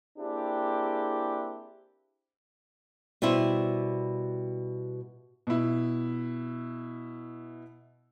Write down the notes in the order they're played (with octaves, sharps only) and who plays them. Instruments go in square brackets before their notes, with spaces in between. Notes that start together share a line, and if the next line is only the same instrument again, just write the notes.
[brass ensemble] A#3 C4 D4 E4 G4 G#4
[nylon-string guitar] B2 G3 C4 E4
[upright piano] B2 E4